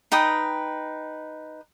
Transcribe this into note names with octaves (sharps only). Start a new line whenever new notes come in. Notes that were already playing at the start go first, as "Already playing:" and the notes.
D#4 B4 G5 D#6